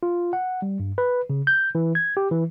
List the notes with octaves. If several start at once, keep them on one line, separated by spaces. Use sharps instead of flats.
F4
F#5
G3
G2
B4
C#3
G6
E3
G#6
G4
E3